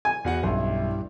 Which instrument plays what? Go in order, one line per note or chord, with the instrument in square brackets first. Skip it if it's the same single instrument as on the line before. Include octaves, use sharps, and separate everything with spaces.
[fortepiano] G#5
[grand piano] E2 F#4 F#5
[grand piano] B1 [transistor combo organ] G2 [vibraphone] C#4 E4 E5